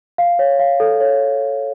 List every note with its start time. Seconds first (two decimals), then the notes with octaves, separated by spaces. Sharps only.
0.18 F5
0.39 C#5
0.59 F5
0.80 A4
1.01 C#5